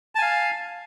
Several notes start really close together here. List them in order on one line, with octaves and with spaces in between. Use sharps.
A5 G#5 F5